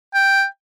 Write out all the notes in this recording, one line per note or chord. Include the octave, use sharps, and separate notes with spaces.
G5